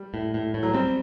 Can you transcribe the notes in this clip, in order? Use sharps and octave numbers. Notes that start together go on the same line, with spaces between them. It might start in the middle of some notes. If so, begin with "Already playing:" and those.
Already playing: G3
A2
A2
A2
F#3
G3 C4